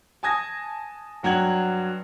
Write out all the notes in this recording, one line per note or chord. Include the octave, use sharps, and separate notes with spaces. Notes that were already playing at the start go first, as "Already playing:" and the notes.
G#5 A5 D#6 G#6 A#6
G2 F#3 G5 G#6 F#7